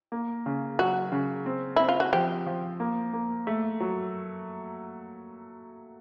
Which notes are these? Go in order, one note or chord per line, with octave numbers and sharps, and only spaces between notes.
A#3
C#3
F#3 F#4
C#3
C4
C4 E4
F4
F#4
F3 G4
F3
A#3
A#3
A3
F#3